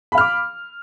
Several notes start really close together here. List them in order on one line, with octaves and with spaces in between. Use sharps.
B5 F5 F6 D6